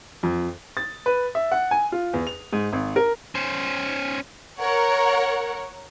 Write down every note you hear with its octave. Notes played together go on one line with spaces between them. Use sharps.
F2
A6
B4
E5
F#5
G#5
F4
E2
F7
G#2
G#1
A#4
C#4 C5
A#4 C#5 F#5